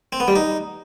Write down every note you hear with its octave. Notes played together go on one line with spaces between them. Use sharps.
C4
B3
G3
D#4